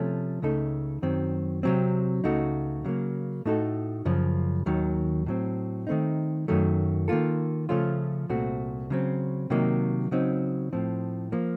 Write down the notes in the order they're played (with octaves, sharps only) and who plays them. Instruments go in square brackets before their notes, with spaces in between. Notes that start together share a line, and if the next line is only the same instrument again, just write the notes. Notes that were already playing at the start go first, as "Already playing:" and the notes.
Already playing: [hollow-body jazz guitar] C3 F3 A3 C#4
C#2 C#3 A3 D#4 A4
F#2 D#3 F#3 C4
C3 F#3 C4
C#2 C#3 A3 D#4 F#4
C#3 F#3 A#3
A2 A3 D#4 F#4 A4
F#2 C#3 F3
D#2 D#3 F#3
A2 F#3 C4
D#3 A3 C4 D#4
F#2 D#3 F#3 A3
D#3 A#3 F4 A4
C#3 F3 A3 C#4 F4
C2 A#2 A3 C4 F#4
C#3 F#3 C4
C3 D#3 F#3 A#3
C#3 F#3 C4 D#4
A2 F3 C4
F3 A#3